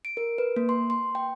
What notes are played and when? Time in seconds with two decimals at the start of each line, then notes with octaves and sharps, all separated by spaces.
0.05 D7
0.17 A#4
0.38 B4
0.56 A#3
0.69 C6
0.90 C6
1.15 G5